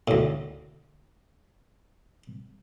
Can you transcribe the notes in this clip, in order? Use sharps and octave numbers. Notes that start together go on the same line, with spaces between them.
D2 A2